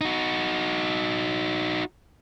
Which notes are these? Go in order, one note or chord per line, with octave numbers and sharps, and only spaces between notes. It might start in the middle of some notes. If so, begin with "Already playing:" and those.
D#4 F#4